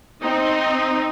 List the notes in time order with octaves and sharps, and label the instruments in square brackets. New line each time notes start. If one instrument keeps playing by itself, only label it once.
[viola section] C4 D#4